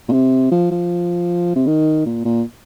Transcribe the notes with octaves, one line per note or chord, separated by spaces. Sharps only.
A#2
C3
F3
F3
C3
D#3
A#2
A#2